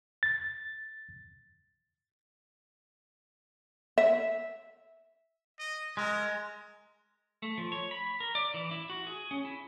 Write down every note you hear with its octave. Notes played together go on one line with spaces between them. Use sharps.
A6
E5
D#5
G#3 A#4
A3
F3
C#5
B5
A#4
D5
E3
E4
F#4
G#4
C#4
E4